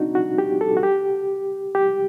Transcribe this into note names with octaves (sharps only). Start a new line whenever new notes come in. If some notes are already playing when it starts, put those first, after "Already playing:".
Already playing: C4 D4 D#4 F#4
F#4
G4
A4
F#4
G4
G4